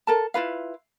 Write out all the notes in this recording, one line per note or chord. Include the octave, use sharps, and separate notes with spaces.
A4 A#4 A5
E4 F4 B4 F5